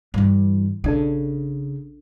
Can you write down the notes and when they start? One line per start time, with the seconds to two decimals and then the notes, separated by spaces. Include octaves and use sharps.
0.14 G2 E3
0.84 A#1 C#3 D4 A4